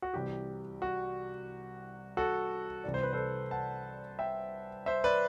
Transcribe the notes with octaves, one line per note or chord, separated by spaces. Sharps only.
F#4
C2 C3 E3 G4
F#4
F#4 A4
C2 C3 E3 D5
C5
B4
A4 C5
F#5 A5
E5 G5
C5 E5
B4 D5